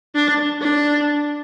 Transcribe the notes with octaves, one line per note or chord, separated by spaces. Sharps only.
D4
D4